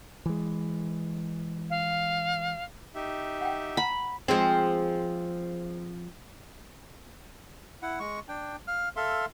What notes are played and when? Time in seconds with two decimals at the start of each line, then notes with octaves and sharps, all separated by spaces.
0.26 E3 G#3
1.70 F5
2.95 D#4 G4 E5
3.41 F#5 G5
3.77 F#5 A#5 B5
4.28 F3 G#3 C4
7.82 E4 F#5
8.00 G#3 C#6
8.28 D4 G5
8.67 F5 F6
8.96 A4 E5 F5 C6